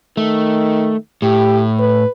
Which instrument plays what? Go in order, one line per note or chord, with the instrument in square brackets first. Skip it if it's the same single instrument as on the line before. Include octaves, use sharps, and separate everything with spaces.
[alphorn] D#3 [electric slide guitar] A3
[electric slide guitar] A2 [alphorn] G4
[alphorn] B4